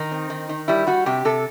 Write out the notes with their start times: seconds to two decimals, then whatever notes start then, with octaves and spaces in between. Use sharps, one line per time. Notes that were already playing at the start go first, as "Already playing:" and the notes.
Already playing: D#3 D#4
0.12 C4
0.30 D#3
0.49 D#3
0.68 G3 E4
0.87 G3 F#4
1.06 C3 G4
1.25 C3 A4